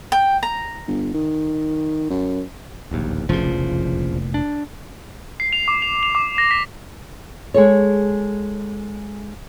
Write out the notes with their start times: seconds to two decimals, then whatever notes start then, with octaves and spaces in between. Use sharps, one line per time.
0.12 G5
0.43 A#5
0.87 G1
1.14 D#3
2.10 F#2
2.91 D1 A#1 D#2
3.29 F1 A#1 E2 A#2 C#3 F3
4.34 D4
5.40 C7
5.53 F7
5.68 D6
5.82 F7
6.03 F7
6.15 D6
6.38 A#6
6.51 B6
7.54 G#3 G#4 A4 C#5